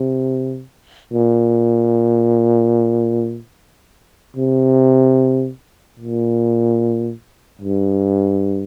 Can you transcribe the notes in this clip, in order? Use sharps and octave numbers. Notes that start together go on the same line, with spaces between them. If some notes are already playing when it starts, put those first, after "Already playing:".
Already playing: C3
A#2
C3
A#2
G2